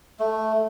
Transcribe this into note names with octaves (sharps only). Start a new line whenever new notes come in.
A3